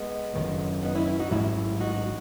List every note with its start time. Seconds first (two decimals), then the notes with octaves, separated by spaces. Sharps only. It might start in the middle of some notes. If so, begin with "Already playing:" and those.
Already playing: G#3 B3
0.33 F#1 F#2 D#3 A3
0.82 B3 D#4
0.95 C#4 E4
1.07 C#4 E4
1.19 D#4 F#4
1.31 A1 G#2 F#3 C#4 E4
1.80 D#4 F#4